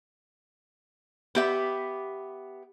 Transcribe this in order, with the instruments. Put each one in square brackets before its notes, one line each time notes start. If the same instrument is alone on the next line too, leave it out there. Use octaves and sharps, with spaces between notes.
[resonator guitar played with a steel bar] B3 G4 E5